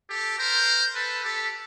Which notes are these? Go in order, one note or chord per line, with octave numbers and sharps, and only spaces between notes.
G4 A4
A#4 C5
A4 B4
G4 A4